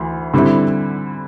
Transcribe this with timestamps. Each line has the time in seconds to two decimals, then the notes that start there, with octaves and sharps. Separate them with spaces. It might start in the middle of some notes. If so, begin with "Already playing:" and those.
Already playing: D2 E3
0.34 D3 G3 C4 E4